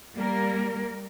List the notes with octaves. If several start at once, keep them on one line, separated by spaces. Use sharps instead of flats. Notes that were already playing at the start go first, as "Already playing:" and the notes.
G3 A#3 A#4